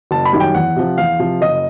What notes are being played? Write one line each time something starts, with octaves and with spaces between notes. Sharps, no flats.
F#1 A5
B5
F#2 D#3 G3
G5
E2 F#5
C3 F3
E2 F5
C3 F3
F#1 D#5